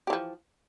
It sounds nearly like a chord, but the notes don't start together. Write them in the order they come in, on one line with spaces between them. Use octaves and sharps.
G4 E3 F3